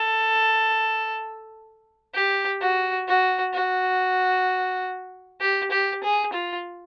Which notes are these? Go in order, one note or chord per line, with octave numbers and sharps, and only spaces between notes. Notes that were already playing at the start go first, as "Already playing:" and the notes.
Already playing: A4
G4
F#4
F#4
F#4
G4
G4
G#4
F4